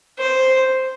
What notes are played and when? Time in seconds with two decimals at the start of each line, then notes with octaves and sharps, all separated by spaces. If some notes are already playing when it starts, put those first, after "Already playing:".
0.19 C5